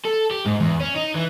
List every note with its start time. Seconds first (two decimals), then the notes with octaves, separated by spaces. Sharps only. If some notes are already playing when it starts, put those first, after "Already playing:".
0.05 A4
0.31 G4
0.46 G#2
0.60 E2
0.81 C#4
0.96 D#4
1.15 E3